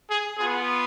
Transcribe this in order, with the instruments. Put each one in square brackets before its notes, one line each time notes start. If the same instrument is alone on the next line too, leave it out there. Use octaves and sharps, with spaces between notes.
[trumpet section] G#4
B3 F4 G#4